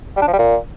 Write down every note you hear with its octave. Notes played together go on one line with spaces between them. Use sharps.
G3
D4
F3
G3
A#2